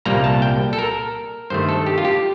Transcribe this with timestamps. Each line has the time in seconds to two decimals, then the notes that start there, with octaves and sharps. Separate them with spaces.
0.05 C2 A#2 G3 A#3 A#5
0.24 A5
0.42 G5
0.73 A4
0.79 A#4
1.50 G2 D#3 A3 C5
1.69 A4
1.86 G4
1.98 F4
2.05 G4